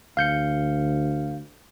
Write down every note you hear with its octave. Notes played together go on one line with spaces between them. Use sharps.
D2 F5 G6 C#7